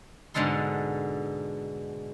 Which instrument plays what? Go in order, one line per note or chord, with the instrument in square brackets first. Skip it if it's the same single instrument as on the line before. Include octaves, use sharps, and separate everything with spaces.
[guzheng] G#2 B2 D3 G#3 A4 C6